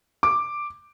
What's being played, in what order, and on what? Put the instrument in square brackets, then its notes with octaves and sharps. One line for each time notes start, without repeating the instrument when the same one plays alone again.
[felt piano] D6